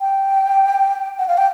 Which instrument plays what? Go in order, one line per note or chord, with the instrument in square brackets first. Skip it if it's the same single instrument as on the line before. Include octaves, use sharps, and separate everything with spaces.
[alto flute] G5
F#5
F5
G5